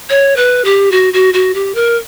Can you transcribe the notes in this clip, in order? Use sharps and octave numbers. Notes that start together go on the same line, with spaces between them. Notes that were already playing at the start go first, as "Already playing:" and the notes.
C#5
B4
G4
F#4
F#4
F#4
G4
A#4